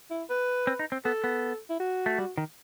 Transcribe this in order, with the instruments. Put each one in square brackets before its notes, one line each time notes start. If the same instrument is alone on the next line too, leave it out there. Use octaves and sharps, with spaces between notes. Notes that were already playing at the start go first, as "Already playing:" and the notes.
[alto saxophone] E4
B4
[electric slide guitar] C4
D#4
C4
[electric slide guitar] B3 [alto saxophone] A4
[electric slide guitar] B3
[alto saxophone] E4
F#4
[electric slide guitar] A3
G3
D#3